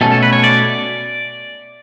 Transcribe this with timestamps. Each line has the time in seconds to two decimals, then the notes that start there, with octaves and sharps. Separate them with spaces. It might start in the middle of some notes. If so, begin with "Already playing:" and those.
0.01 B2 A3 C#4 A4
0.12 A4
0.23 B4
0.33 C#5
0.44 D5